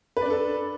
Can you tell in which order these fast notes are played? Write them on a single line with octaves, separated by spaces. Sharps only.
B4 D5 D4 A4